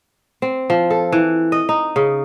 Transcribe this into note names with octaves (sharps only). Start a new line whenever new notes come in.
C4
F3
A4
E3
D#5
D#4
C#3